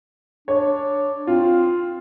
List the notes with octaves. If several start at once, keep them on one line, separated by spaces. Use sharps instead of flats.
D4 C#5
C4 F4